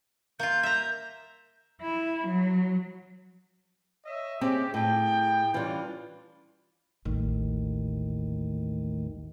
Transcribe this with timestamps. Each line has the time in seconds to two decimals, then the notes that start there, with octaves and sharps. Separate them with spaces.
0.40 A#3 F4 G6
0.63 E5 A#5
1.82 E4
2.28 F#3
4.05 C#5 D#5 E5
4.41 C#3 G#3 C4 C#4 G4
4.74 A2 E4 G#4 G5
5.54 E3 G3 C#4 D4 F4
7.05 A1 D#2 A2 D#3